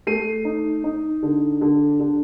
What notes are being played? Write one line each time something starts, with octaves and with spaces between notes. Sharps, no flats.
A3 C7 D#7
D#4
D#4
D3
D3
D3